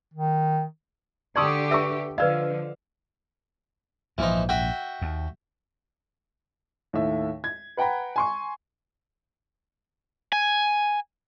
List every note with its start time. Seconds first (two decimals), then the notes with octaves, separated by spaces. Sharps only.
0.14 D#3
1.36 D3 G4 D5 A5 C6 C#6 D#6 E6
1.71 B4 E5 C#6 E6
2.18 D3 F3 B4 D5 D#5 F5 E6
4.18 A#1 G#2 E3 F3 D#4
4.49 F#4 E5 G5
5.02 D#2
6.93 D#2 A2 A3 E5
7.44 G#6
7.77 B4 F#5 G5 A#5 B5
8.16 G#5 C6 C#6
10.32 G#5